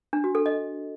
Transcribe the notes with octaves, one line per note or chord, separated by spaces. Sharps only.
D4
F#4
A4
D#5